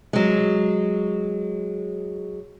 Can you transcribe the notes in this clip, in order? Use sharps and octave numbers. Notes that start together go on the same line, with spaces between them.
F#3 G#3